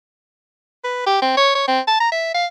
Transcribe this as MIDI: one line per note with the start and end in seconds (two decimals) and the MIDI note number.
0.84 1.06 71
1.06 1.19 67
1.22 1.33 60
1.37 1.51 73
1.55 1.67 73
1.68 1.80 60
1.87 1.98 81
2.00 2.10 82
2.12 2.32 76
2.34 2.46 77